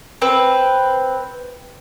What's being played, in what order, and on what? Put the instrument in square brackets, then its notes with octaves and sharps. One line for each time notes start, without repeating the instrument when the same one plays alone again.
[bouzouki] C4 B4